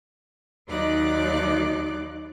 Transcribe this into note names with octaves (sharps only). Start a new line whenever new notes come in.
D#2 F#3 D#4 D5 D6 F#6